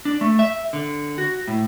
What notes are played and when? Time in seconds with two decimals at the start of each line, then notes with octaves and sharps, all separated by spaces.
0.05 D4
0.21 A3
0.39 E5
0.73 D3
1.18 F#4
1.48 A2